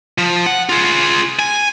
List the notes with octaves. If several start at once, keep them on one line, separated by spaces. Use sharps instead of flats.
F3
F#5
F4 G#4
G#5